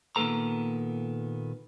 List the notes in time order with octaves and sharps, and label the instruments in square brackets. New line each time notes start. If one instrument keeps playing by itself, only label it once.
[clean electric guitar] A#2 D#3 A#3 B3 A4 A#5